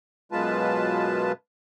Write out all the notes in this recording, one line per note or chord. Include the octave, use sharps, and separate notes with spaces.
F#2 B2 G#3 F4 B4 A5